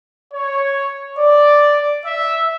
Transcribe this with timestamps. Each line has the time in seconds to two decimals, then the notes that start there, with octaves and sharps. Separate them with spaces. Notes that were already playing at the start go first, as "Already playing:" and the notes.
0.34 C#5
1.19 D5
2.06 E5